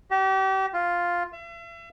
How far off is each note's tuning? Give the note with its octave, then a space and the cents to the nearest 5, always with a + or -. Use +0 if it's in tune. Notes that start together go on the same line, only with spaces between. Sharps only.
G4 -35
F4 +0
E5 +40